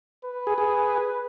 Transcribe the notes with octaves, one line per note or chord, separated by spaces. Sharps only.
B4
G#4
G#4